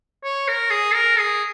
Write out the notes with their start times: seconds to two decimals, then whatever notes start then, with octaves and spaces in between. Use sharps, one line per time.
0.24 C#5
0.48 A#4
0.71 G#4
0.94 A#4
1.19 G#4